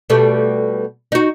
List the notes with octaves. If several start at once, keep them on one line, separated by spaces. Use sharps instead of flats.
B2 G3 A3
D#4 F#4